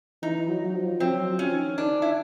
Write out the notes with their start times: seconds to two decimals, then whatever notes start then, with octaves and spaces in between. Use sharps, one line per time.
0.23 E3 D#4
0.49 F#3
0.64 F#3
0.75 F3
1.00 F#3 C4
1.26 F3
1.39 C#4
1.52 D#3
1.78 D#3 D4
2.02 E4